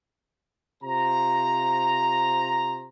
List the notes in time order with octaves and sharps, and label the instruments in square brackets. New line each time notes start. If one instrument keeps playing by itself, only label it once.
[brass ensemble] C3 F4 C5 A#5